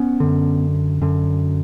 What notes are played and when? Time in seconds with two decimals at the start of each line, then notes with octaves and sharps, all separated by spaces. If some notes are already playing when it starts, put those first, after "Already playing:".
Already playing: B3 C#4
0.20 F#2 D3
1.01 F#2 D3